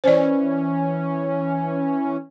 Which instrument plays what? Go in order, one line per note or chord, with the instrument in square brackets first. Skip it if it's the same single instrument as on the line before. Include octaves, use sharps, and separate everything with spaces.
[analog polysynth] E3 C#4 [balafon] C5 D5